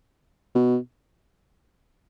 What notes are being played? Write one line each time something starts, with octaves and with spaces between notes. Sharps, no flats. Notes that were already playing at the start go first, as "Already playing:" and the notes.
B2